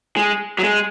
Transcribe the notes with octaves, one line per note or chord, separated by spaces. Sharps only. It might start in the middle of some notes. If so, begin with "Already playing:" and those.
G#3
F#3
G#3